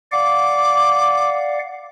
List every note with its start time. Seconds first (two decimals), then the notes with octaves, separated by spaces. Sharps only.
0.12 D5 F5 F#5 D6